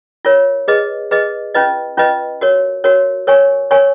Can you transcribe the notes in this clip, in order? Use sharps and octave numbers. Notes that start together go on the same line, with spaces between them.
F4 A#4 C#5
G#4 B4 D#5
G#4 B4 D#5
C#4 F4 B4 D#5
C#4 F4 B4 D#5
F#4 A#4 C#5
F#4 A#4 C#5
A#4 C#5 G#5 C#6
A#4 C#5 G#5 C#6